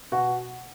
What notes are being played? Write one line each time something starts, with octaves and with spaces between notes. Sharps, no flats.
B2 F#4